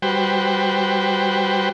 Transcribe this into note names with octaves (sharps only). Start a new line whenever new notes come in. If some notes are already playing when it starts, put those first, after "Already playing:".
G3 F#4 B4 C5 G5